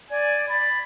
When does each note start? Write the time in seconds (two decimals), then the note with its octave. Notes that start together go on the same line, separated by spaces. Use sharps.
0.11 D5 G#5
0.49 B5 A6